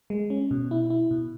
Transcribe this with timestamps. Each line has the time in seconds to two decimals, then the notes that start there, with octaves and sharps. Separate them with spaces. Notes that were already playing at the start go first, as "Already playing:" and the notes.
0.10 G#3
0.30 C#4
0.51 B2
0.71 E4
0.90 E4
1.11 B2